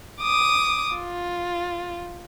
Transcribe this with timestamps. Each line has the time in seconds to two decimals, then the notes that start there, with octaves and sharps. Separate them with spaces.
0.21 D6 D#6
0.96 F4